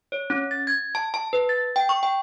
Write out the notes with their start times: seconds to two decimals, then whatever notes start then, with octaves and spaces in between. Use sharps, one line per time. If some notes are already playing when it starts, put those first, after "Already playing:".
0.12 C#5
0.30 C#4
0.51 A6
0.67 G#6
0.95 A5
1.14 A5
1.33 B4
1.49 A6
1.76 G5
1.89 C#6
2.03 G5